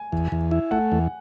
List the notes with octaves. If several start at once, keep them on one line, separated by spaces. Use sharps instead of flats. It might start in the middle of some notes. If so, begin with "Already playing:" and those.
Already playing: G#5
E2
E2
E4
A3 F#5
E2